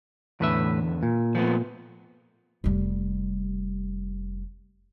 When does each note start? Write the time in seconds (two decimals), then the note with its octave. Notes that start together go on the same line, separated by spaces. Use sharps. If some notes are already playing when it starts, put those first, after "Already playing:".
0.41 E2 A2 D3 B4 E5
1.03 A#2
1.35 F3 A3 B3
2.64 F1 G3